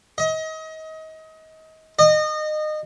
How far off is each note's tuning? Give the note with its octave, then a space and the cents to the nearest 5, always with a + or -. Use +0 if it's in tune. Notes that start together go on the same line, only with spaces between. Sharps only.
D#5 +30
D#5 -25